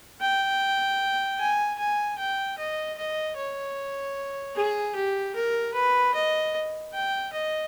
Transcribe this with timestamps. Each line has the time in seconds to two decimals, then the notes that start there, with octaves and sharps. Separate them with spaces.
0.21 G5
1.39 G#5
1.79 G#5
2.18 G5
2.58 D#5
2.98 D#5
3.37 C#5
4.56 G#4
4.95 G4
5.35 A#4
5.74 B4
6.14 D#5
6.93 G5
7.32 D#5